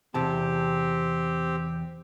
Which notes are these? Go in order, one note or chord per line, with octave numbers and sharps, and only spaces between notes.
E2 C3 C4 G4 A5